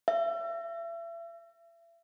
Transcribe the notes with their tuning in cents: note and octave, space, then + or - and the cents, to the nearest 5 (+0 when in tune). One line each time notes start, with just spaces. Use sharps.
E5 +35